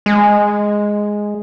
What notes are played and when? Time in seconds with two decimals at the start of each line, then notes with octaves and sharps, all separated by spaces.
0.06 G#3